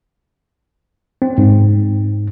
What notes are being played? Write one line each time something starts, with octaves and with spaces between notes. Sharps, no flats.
C4
G#2